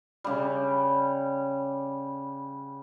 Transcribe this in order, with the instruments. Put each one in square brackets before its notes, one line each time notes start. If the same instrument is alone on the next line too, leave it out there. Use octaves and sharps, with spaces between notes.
[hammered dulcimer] C#3 G3